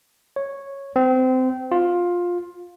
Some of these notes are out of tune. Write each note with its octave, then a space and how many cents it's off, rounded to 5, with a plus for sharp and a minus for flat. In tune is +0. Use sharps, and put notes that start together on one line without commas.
C#5 -5
C4 -25
F4 +15